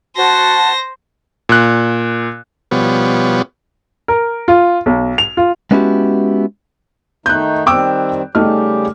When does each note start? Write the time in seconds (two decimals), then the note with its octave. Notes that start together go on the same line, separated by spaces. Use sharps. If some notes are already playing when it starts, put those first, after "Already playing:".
0.16 F#4 C5 A5 A#6
1.49 A#2 F#6
2.71 B2 F3 G3 B3 C#5
4.08 A#4
4.48 F4
4.86 B1
5.18 F7
5.37 F4
5.71 G#3 B3 C#4 E4 F#4 G4
7.26 D#3 A3 D#4 F#6 G6
7.66 D#3 G3 C4 G5 D6 E6
8.35 C#3 G3 A3 D#4 G4 F6